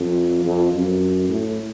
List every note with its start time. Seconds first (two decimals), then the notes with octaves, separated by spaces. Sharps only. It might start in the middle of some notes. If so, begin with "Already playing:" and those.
Already playing: F2
0.45 F2
0.73 F#2
1.29 A2